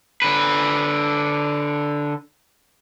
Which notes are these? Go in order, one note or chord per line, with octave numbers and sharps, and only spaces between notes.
D3 B4